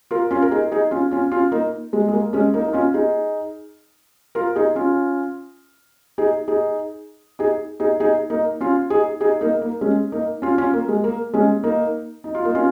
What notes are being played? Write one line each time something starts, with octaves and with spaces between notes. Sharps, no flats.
F4 A#4
C#4 F4
A#4
D#4 G#4
D#4 G#4
C#4 F4
C#4 F4
C#4 F4
A#3 D#4
G#3
G#3
A#3
G#3 C#4
A#3 D#4
D#4
C#4 F4
D#4 G#4
F4 A#4
D#4 G#4
C#4 F4
D#4 G#4
D#4 G#4
D#4 G#4
D#4 G#4
D#4 G#4
A#3 D#4
C#4 F4
D#4 G#4
D#4 G#4
A#3 D#4
A#3
G#3 C#4
A#3 D#4
C#4 F4
C#4 F4
A#3
G#3
A#3
G#3 C#4
A#3 D#4
D#4
F4
A#3 D#4
C#4 F4